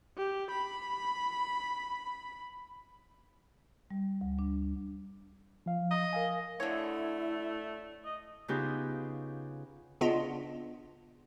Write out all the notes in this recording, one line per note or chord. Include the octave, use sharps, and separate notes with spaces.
G4
B5
G3
D2
D4
F3 F5
D#5
A#4 F5 G#5
D3 A3 E4 C#5
D#5
C#3 B3 D#4 F4 G4
C#3 B3 D4 F4 D#5